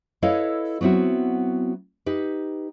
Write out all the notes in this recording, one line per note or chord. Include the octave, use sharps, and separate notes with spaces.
E4 A4 B4 C#5 D#5 F5
F#3 B3 C4 E4 F#4
D#4 G4 B4